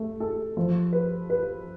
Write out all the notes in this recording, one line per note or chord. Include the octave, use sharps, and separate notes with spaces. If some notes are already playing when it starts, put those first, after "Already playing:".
Already playing: A3
A4
F3
B4
B4